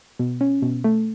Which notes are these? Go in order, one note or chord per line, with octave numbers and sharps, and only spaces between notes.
B2
C#4
B2
A3